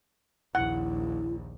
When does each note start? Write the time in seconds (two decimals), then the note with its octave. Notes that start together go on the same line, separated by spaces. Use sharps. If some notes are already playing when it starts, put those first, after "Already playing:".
0.55 A#1 D#2 E4 F#5